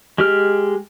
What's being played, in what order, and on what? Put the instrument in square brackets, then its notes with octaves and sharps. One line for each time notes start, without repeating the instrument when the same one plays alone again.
[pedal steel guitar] G#3 G4 F6